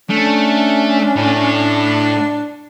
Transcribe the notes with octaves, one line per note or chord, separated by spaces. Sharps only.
A3 C#4 D4
A2